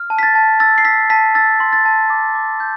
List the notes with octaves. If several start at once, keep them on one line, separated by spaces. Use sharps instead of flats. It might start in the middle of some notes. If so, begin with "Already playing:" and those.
Already playing: F6
A5
B6
A6
A5
E6 A6
C7
E6 B6
A5 B6
E6 A6
C6
A6
A5
D6
D6
G6